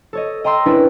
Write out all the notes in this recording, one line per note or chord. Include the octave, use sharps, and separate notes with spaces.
A4 C#5 D#5
D#5 G5 A#5 C6 E6 A#6
C#4 D4 E4 A#4 B4